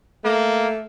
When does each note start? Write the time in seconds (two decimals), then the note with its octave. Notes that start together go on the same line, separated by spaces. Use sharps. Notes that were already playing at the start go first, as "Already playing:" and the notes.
0.24 A3 A#3